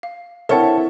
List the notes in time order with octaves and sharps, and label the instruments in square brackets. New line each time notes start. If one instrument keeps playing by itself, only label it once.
[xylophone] F5
[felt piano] C4 E4 E5 [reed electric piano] A4 C#5 A5 [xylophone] A#4 F#5